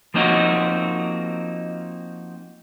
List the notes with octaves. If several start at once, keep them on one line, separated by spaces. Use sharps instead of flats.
F3 A#3 C4 D#4 F4 F#4